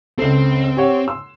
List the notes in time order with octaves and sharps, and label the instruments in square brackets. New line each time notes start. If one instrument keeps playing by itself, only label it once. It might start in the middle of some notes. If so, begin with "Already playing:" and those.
[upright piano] C#2 A4 [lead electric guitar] C4
[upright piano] G4 C#5 F#5
C6 E6